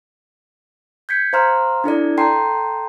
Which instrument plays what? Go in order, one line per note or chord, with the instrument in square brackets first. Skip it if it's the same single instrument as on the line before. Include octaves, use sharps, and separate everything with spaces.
[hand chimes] G6 G#6 B6 C#7
C5 F5 A#5 C6 F6
D4 E4 A4 D5
A4 G5 A5 A#5 C6 C7